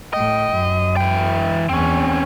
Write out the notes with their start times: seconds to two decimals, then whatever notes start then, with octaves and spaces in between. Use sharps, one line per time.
0.13 A2 D#5 G5
0.53 F#2
0.97 E3 G5
1.69 E2 C4 C#4